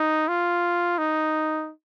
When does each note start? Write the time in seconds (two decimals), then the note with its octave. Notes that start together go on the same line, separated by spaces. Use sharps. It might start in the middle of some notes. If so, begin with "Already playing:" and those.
Already playing: D#4
0.28 F4
0.98 D#4